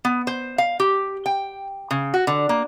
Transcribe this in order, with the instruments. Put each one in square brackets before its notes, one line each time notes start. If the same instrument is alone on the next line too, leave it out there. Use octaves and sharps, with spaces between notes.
[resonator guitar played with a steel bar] B3
C5
F5
G4
G5
C#3
F#4
D3
A#3